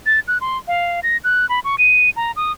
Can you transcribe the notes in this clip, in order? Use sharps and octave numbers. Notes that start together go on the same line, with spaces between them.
A6
F#6
C6
F5
A#6
F#6
B5
C#6
D#7
A#5
D#6